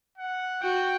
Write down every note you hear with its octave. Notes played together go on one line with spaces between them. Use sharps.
F#5
F#4 G5